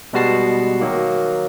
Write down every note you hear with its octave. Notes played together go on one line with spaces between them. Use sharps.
B2 G3 G#3 F#4 A5 C7
D#3 F#3 A#3